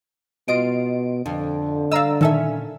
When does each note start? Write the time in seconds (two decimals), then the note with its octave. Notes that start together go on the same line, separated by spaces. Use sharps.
0.48 B2 F4 D#5 D7
1.26 F2 D3
1.91 D5 D#5 F5 A#5 E6
2.21 A#2 D#3 C#4 A4 E5